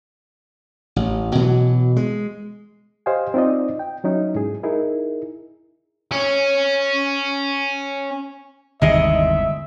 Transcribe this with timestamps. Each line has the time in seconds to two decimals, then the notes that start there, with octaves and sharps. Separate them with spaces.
0.96 A1
1.35 B2 E3 F#3
1.97 G#3
3.06 G4 C5 D#5 F5 G#5
3.34 C4 D#4 F4 D5 D#5
3.79 G5
4.04 F#3 C#4 D#4 E4
4.35 G#2 G#4
4.63 D#4 E4 G#4 A#4
6.12 C#4 C#5
8.82 G1 D#2 C3 E3 G#3 D#5 E5